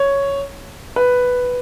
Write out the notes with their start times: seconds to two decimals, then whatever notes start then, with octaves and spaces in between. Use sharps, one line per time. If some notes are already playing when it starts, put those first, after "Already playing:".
Already playing: C#5
0.96 B4